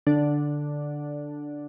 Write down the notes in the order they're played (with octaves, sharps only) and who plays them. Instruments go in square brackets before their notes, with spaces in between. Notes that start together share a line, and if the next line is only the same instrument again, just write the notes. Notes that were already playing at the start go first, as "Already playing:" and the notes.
[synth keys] D3 D4